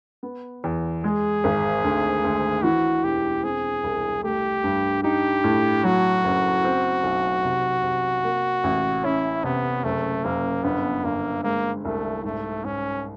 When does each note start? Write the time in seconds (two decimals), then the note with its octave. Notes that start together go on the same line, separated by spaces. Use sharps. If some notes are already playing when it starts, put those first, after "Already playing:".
0.23 B3
0.64 E2
1.04 G#3 G#4
1.44 G#1
1.84 D2
2.24 D2
2.63 E3 F#4
3.04 E1 G4
3.43 C4 G#4
3.84 C2
4.23 A3 G4
4.64 G2
5.03 D#4 G4
5.44 A2
5.84 F#3 F#4
6.24 F#1
6.64 C4
7.03 B1
7.45 C3
7.83 C3
8.24 A#3
8.64 A1
9.03 C#4 E4
9.44 C3 B3
9.84 F#1 A3
10.24 F#1 A#3
10.64 G1 B3
11.04 G1 A#3
11.44 G#3 A#3
11.85 C2 A3
12.24 G#2 A3
12.64 G#2 C#4